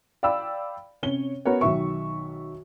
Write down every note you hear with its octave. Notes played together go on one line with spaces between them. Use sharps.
D5 F5 G5 B5 E6
C3 C#4 C#5 G7
B3 F#4 A#4 B4 C#5
B1 D#3 E5 C#6